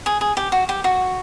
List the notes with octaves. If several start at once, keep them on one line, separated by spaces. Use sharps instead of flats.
G#4
G#4
G4
F#4
G4
F#4